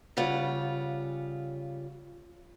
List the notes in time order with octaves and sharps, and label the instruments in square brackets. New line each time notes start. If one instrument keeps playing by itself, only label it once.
[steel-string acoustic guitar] C#3 G3 F4 F#5